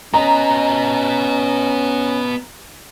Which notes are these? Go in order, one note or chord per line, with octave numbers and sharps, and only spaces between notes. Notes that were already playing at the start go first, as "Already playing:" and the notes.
B3 C#4 D#5 A#5